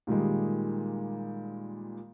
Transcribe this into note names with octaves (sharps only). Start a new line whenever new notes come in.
A#2 D#3 G3 G#3